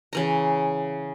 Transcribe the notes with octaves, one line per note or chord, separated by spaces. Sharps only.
C#3 E3 A#5